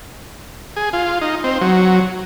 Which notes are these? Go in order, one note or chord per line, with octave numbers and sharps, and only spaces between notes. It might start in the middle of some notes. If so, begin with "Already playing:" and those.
G#4
F4
D#4
C4
F#3